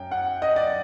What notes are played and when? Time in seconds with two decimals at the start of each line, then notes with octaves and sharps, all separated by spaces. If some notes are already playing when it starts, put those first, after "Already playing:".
Already playing: F#2 G5
0.11 F#5
0.42 D#5
0.56 D5